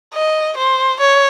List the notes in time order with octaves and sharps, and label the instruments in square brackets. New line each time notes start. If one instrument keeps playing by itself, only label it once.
[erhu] D#5
C5
C#5